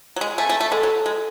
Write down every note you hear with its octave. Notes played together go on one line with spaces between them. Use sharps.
F#3
G#3
A3 G#5
A3
A3
G#3 A4
F#3
G#3